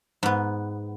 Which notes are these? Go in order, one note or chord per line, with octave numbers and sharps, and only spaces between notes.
G#2 B3